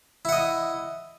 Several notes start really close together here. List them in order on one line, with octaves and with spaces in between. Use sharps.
E4 F#5 D#5